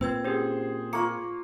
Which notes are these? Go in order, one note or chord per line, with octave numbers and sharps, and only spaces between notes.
A#2 C4 B4 E6 G#6
C#4 G4 G#4 C5
A#3 F4 C#6 C#7